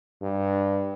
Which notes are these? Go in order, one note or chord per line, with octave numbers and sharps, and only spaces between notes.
G2